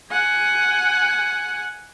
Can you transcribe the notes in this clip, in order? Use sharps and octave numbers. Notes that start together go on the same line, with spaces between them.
F#5 G#5